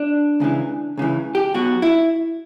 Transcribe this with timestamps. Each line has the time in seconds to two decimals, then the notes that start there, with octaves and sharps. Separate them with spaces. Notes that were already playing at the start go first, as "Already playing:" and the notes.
Already playing: D4
0.40 C#2 C#3 E3
0.97 C#2 C#3 E3
1.35 G4
1.54 B1 B2 F#4
1.82 E4